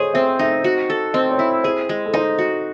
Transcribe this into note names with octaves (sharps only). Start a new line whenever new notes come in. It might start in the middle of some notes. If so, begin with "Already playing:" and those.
Already playing: G#4 C5 C#5 D#5
C4 E5
D#4 E5
F#4
A4
C4 D#5
C#5
E4
G#4 C5
G#3
A4
D#4 C5
F#4